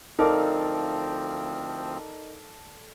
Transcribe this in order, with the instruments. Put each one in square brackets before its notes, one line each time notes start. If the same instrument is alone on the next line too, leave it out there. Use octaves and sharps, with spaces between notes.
[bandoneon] D2 F3 C4 [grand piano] D#4 A#4 [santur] A4 D5 F5